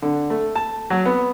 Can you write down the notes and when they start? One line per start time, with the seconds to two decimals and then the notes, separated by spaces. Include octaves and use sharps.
0.02 D3
0.30 A3
0.56 A5
0.90 F#3
1.05 B3